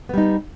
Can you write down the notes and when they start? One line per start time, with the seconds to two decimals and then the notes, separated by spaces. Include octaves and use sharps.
0.09 B3
0.14 G3
0.18 D#4